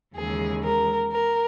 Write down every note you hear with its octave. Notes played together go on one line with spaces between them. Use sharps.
D#2 C#3 E3 G#3 G#4
A#4
A#4